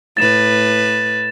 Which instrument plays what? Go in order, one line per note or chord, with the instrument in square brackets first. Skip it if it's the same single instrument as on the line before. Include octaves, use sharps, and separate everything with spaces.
[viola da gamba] A2 B4 [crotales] A6 E7